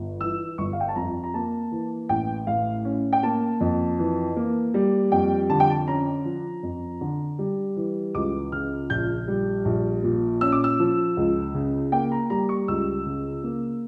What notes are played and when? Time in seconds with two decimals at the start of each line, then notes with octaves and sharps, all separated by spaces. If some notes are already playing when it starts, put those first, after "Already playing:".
Already playing: G1
0.20 E3 E6
0.58 G1 C#6
0.73 F5
0.80 G5
0.88 A5
0.96 F2 A#5
1.24 A#5
1.34 A#3 A5
1.72 E3
2.09 A1 G5
2.47 A2 F5
2.85 C#4
3.13 G5
3.23 A#3 A5
3.61 F2
3.99 E3
4.36 A#3
4.74 G3
5.12 F2 G5
5.49 D3 A5
5.60 G5
5.70 A5
5.87 C#4 A#5
6.25 F3
6.63 F2
7.01 D3
7.39 G3
7.76 E3
8.15 C#2 D6
8.52 C#3 F6
8.90 A#1 G6
9.28 G3
9.65 A#1
10.04 A#2
10.41 C#4 E6
10.52 D6
10.64 E6
10.79 F3
11.17 C#2
11.54 C#3
11.92 A#3 G5
12.12 A#5
12.30 G3 A#5
12.49 C#6
12.68 C#2 E6
13.06 C#3
13.44 A#3